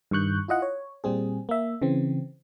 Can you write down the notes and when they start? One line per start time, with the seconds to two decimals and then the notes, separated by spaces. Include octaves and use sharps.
0.11 G2 D#3 C#6 F#6 G6
0.48 E4 F4 D#5 F#5
0.62 C#5
1.04 A#2 G3 C4 G#4
1.49 A#3 E5
1.82 C#3 E3 C4